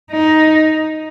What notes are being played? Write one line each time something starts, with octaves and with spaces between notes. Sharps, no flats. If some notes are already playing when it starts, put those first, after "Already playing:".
D#4